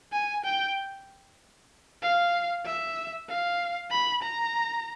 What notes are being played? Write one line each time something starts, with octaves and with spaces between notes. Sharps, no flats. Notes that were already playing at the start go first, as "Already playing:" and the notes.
G#5
G5
F5
E5
F5
B5
A#5